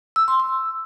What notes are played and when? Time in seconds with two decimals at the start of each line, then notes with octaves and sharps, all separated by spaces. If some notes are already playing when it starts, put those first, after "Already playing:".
0.16 E6
0.28 C6
0.40 E6